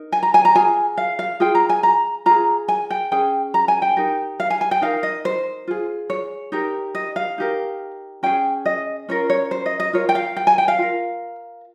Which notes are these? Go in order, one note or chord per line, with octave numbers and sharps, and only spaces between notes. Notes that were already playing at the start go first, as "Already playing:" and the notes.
Already playing: D#4 A#4
G#5
A#5
G#5
A#5
F4 G#4 G#5
F5
F5
F4 G#4 G5
A#5
G#5
A#5
F4 G#4 A#5
G#5
G5
C#4 G#4 G5
A#5
G#5
G5
D#4 G4 A#4
F5
G#5
G#5
G5
D#4 A#4 F5
D#5
C5
F4 G#4
C#5
D#4 G4 A#4
D#5
F5
D#4 G4 A#4
C#4 G#4 G5
D#5
C#4 F4 A#4 C#5
C#5
C5
D#5
D#5
F4 A#4 C#5
G5
F5
G5
G#5
G5
F5
F4 A#4